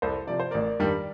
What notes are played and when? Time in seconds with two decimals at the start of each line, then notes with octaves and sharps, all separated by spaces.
0.02 C2 A4 C5
0.27 C3 F3 D5
0.40 C5
0.51 A1 A#4 D5
0.79 G2 D#3 G3